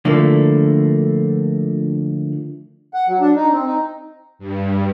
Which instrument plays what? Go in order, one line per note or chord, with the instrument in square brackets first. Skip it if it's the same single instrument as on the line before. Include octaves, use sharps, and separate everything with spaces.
[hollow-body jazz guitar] D3 F3 A3 A#3 E4
[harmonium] F#5
F#3
D4
D#4
C4
D#4
[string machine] G2